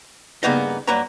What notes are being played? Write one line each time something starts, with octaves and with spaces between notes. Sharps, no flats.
G2 C#3 A#3 B3 D#4 D#5
G2 F#3 A#3 A#4 B4 A#5